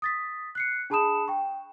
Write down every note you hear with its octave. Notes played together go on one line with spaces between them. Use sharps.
D#6 A6 B6
F#6 C7 C#7
D4 G#4 A5 B5 D#6 E7
G5 C#6